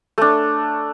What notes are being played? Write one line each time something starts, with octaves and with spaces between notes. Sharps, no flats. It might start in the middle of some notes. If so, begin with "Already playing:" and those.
A3 D4